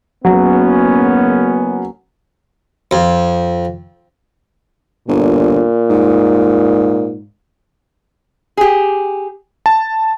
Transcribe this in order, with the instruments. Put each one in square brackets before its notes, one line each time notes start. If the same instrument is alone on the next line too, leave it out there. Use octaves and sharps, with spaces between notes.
[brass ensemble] F#1 B3 C#4 [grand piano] F#3
[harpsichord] F2
[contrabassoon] G1 [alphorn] A#2
[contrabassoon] G#2
[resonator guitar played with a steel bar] G4 G#4
[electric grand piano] A5